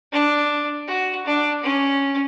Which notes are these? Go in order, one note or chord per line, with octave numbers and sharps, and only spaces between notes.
D4
F#4
D4
C#4